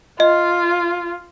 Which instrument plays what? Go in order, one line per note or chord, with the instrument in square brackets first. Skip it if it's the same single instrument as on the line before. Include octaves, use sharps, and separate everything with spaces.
[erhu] F4 [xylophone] D#5